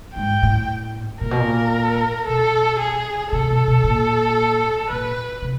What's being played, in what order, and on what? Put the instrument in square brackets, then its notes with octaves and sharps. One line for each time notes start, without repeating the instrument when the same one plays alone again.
[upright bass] G#2 [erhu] G5
[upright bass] A2
[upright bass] A#2 [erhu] A#4
[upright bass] B2
A#2
[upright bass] B2 [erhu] A4
[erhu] G#4
[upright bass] C3 [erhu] A4
[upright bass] B2
B2
A#2
[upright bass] A#2 [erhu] B4
[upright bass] C3